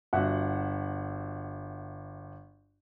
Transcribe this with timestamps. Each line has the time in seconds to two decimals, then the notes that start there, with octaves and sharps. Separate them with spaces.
0.13 G1 F#4 E5 F#5 F#6